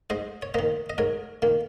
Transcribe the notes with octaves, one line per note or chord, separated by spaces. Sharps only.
G#2 C5 D#5
C#5
D#3 A#3 C5 D#5
D#5
G#2 A#4 C#5
D#3 A#3